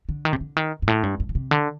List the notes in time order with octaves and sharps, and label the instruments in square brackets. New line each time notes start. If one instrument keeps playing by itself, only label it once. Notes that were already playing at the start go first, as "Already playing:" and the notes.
[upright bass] D3
D#3
C3
D3
D#3
G2
A2
G2
G2
D3
C3
D3